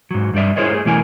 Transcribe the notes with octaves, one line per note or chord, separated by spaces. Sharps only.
G#2 F#3
G2 G3 A3 D5 E5
E4 G#4 A#4 C5 C#5 D#5
A3 G#4
B2 E3 A3 E4 A#4 G#5